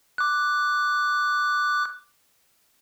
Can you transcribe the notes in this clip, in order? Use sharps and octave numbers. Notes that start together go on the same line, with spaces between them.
D6 F#6